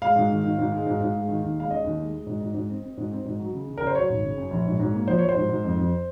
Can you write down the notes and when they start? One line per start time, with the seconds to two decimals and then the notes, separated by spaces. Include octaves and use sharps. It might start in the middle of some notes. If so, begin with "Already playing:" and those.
0.02 G#3 F5
0.16 G#2
0.29 D#3
0.44 D#3
0.58 G#2
0.72 G#3
0.86 G#2
1.00 G#2
1.15 G#3
1.28 D#3
1.43 D#2
1.57 G#3 F5
1.70 C#4 D#5
1.84 D#2
1.99 G#3
2.13 G#3
2.26 G#2
2.41 G#2
2.54 G#2
2.69 C4
2.83 C4
2.97 G#2
3.11 C4
3.25 G#2
3.39 F#3
3.53 C#3
3.67 C#3
3.78 A#4
3.81 C#3
3.87 C5
3.95 F#3 C#5
4.09 G#1
4.23 C#3
4.37 F#2
4.51 A#1
4.65 G#2
4.80 G#2
4.94 A#3
5.07 F3 C5
5.19 F3 C#5
5.29 C5
5.35 G#2
5.49 G#2
5.64 F2
5.77 F2